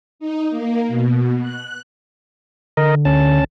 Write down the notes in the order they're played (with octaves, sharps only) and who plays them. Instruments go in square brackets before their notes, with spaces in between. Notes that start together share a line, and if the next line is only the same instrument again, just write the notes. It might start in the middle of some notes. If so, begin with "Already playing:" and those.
[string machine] D#4
A#3
B2
F#6
[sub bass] D3 [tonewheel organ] A#4 D#5
[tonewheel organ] D2 C#4 A5